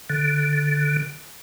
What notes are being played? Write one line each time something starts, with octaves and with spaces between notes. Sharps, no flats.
D3